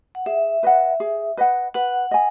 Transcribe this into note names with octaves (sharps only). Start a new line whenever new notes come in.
F#5
G#4 E5
B4 D#5 F#5
G#4
B4 D#5 F#5
B4 F#5
D#5 G#5